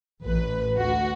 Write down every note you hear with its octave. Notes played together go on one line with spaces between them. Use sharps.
A1 B4
D2 F#4